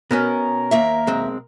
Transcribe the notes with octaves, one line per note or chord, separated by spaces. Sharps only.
B2 B3 C#4 A#4
D#2 A#3 E5
B1 G#3 C4